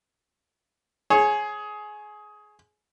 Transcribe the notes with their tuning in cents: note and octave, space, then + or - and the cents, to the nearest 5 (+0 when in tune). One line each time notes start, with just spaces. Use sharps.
G#4 +15 C#5 -15